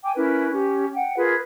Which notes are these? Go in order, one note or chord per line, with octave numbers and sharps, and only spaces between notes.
G5 G#5 D6
C#4 E4 A#4 B4
C#4 G4
F#5 G5
F4 G#4 A#4 B4